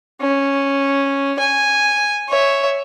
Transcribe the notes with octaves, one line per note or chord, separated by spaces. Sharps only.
C#4
G#5
C#5 E5